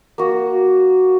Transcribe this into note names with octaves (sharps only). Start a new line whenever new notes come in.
A#3 F#4